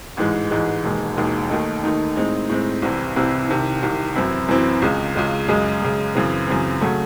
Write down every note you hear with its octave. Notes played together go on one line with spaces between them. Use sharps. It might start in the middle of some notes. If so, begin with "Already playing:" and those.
A1 G#2 E3 G#3
A1 G#2 E3 G#3
E1 D#2 D#3 G#3
E1 D#2 D#3 G#3
D#2 D#3 A3 D#4
D#2 D#3 A3 D#4
A2 G#3 C4 D#4
A2 G#3 C4 D#4
C2 C3 E3 C4 E4
C2 C3 E3 C4 E4
C2 C3 D#3
C2 C3 D#3
F#2 E3 C4 E4
F#2 E3 C4 E4
C#2 C#3 G#3
C#2 C#3 G#3
F#2 C#3 G#3
F#2 C#3 G#3
F#2 C#3 E3 C4
F#2 C#3 E3 C4
C#3 F#3 A3